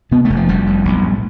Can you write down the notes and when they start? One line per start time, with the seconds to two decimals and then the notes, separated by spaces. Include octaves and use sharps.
0.11 C3 B3
0.25 F1 A3
0.36 F3
0.48 F1 G3
0.67 F2
0.85 B1
1.02 A2